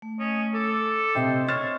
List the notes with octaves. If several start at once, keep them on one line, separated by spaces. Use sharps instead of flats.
A3
C#4 D#5
A4 D6
C3 C5 D#5 E5 G5 C6 D#6
C5 C#5 F6 A6 E7